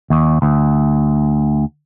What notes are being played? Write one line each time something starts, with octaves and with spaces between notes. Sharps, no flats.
D#2
D2